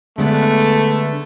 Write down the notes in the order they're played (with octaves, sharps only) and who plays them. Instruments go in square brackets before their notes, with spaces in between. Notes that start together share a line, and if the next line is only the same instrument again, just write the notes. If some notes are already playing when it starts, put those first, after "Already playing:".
[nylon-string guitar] D3 G#3 B3 [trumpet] A3